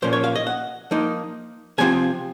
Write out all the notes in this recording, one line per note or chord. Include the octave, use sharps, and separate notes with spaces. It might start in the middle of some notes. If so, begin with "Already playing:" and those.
A#2 F3 A#3 C#4 C5
C#5
F5
D#5
F#5
F3 A#3 D#4
C3 F3 C4 F4 G#5